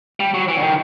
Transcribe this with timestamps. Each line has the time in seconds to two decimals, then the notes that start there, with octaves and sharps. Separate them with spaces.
0.20 G3
0.34 F#3
0.48 E3
0.57 D3
0.63 D#3